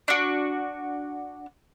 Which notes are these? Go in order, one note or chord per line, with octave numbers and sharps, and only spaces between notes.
D4 F#4